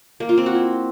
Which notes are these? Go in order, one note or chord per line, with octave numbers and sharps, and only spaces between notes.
A#3
F4
C4
F#4
E4